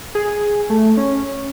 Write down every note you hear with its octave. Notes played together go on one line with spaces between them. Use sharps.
G#4
A3
C#4